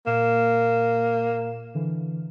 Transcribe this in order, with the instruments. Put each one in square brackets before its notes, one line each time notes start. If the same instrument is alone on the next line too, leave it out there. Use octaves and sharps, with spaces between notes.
[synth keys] A#2 E7 [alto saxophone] A#3
[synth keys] D3 E3